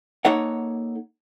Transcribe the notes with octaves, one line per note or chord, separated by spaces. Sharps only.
A#3 D#4 A4 C#5 F#5